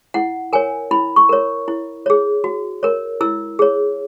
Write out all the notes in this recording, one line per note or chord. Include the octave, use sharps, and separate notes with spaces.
E4 F#5
A#4 C#5 G#5
E4 B5
C#6
A#4 C#5
E4
G#4 C#5
F#4
A#4 C#5
E4 E6
G#4 C#5